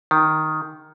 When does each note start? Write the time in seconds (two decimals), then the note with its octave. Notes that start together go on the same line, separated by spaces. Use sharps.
0.11 D#3